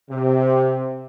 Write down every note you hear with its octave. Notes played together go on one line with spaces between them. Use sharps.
C3